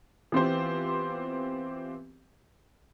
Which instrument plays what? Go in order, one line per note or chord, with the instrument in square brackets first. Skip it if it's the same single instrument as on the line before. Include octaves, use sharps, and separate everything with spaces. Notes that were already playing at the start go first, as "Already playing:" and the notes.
[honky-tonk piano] E3 B3 C4 F4 G4 C5